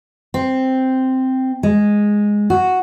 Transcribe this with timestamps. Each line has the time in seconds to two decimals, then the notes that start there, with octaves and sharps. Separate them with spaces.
0.34 C4
1.63 G#3
2.50 F#4